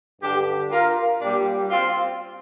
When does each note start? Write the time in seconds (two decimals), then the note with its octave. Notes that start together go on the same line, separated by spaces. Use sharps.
0.21 G2 D3 G3 D4 G4
0.71 F4 A#4
1.20 A#2 G3 D4 G4
1.70 C4 F4